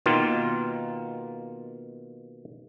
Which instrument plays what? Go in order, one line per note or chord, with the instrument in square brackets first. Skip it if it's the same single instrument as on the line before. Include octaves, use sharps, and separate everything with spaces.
[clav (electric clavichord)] B2 D#3 A#3 F4